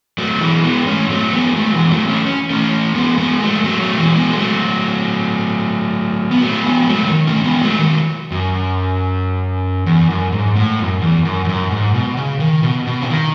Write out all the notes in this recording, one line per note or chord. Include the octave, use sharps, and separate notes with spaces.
F#3 A3
E3 G#3
G#3 B3
A3 C#4
F#3 A3
G#3 B3
F#3 A3
E3 G#3
F#3 A3
A3 C#4
C#4
A3 C#4
G#3 B3
G#3 B3
F#3 A3
F#3 A3
F#3 A3
E3 G#3
G#3 B3
F#3 A3
B3
F#3 A3
G#3 B3
F#3 A3
C#3
D#3
A3 C#4
G#3 B3
F#3 A3
D#3 F#3
F#2
E2
F#2
G#2
A2
F#2
E2
F#2
E2
F#2
G#2
B2
C#3
D#3
B2
B2
C#3
D#3